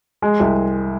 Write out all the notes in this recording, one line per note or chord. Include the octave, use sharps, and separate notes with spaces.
G#3
C2